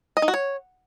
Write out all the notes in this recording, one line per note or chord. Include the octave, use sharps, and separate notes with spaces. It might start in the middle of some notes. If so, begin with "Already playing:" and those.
D#5
D#4
F#4
C#5